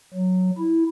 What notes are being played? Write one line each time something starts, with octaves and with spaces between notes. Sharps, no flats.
F#3
E4